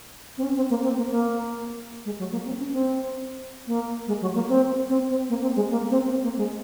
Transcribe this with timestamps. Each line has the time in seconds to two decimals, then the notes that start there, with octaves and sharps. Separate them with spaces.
0.38 C4
0.43 C#4
0.56 C4
0.70 A#3
0.84 C4
0.97 A#3
1.10 A#3
2.05 G#3
2.19 F#3
2.32 A#3
2.46 C4
2.58 C#4
2.72 C4
3.67 A#3
4.07 G#3
4.21 F#3
4.34 A#3
4.49 C4
4.89 C4
5.09 C4
5.29 A#3
5.42 C4
5.56 G#3
5.70 A#3
5.90 C4
6.10 C4
6.23 A#3
6.37 G#3